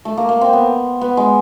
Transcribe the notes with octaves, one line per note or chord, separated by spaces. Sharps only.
A3
A#3
A#3
C4
B3
B3
G#3